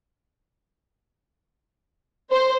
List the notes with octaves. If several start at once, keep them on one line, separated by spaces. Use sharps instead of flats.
C5